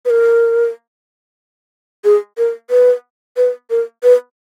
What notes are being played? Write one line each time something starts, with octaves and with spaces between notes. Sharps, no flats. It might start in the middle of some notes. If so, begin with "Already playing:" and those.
B4
A#4
G#4
A#4
B4
B4
A#4
B4